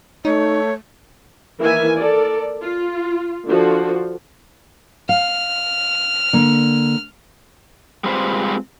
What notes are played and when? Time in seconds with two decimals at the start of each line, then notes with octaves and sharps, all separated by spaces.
0.25 A3 D#4 C#5
1.60 D#3 E3 A#3 A#4 E5 G#5
1.95 A4 A#4 D5
2.62 F4
3.46 D3 F3 F#4
5.09 F5 F6
6.33 D3 A#3
8.04 G3 G#3 C4 F4 B4 C5